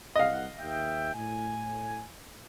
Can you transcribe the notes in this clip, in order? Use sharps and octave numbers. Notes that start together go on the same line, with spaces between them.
C2 D#5 F5 F#5
D#2 E5 G5
A2 G#5